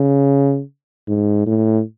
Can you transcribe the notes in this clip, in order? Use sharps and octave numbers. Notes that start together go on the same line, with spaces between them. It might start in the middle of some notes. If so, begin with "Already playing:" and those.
Already playing: C#3
G#2
A2